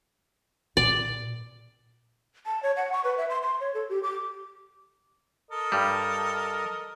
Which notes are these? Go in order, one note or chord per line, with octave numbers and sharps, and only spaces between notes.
A#2 D5
A5
C#5
F#5
C#6
B4
E5
C6
C6
C#5
A4
G4
D6
A4 A#4 D#5
G2 G3